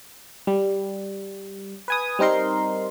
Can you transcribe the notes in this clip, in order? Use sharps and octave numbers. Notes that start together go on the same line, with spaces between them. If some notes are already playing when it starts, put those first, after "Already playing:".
G3
B4 G#5 D#6
G3 C4 D#4 A#4 C6